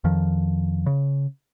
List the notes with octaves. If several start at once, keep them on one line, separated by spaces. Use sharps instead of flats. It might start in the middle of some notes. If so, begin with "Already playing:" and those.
F2 D#3 F3
C#3